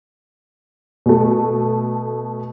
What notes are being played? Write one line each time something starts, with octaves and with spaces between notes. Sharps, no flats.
B2 A3